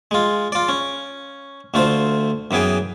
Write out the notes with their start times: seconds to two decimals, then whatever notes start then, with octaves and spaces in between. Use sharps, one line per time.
0.11 G#3 F4
0.52 F4 D5
0.69 C#4
1.74 D2 A3 F4 C5
2.51 F#2 E3 B3 G#4 G5